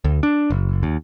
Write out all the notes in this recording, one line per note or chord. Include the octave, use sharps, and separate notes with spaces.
D2
D4
F#1
D#2